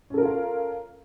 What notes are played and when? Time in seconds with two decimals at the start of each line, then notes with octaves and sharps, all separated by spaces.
0.10 C#4
0.14 A4
0.18 A#4
0.21 F4
0.25 F5